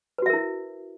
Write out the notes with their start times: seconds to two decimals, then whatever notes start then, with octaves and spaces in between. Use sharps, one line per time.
0.18 B4
0.22 F#4
0.26 E5
0.30 A#4
0.33 E4